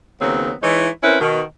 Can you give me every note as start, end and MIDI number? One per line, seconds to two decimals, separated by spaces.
0.20 0.52 39
0.20 0.52 49
0.20 0.52 54
0.20 0.52 59
0.20 0.52 60
0.62 0.88 52
0.62 0.88 56
0.62 0.88 63
0.62 0.88 64
0.62 0.88 73
1.03 1.19 60
1.03 1.19 61
1.03 1.19 64
1.03 1.19 70
1.03 1.19 71
1.20 1.41 47
1.20 1.41 51